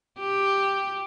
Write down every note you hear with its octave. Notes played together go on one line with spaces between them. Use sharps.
G4